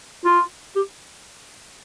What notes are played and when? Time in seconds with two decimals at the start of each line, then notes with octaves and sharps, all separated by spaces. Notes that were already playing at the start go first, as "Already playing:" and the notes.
0.25 F4
0.76 G4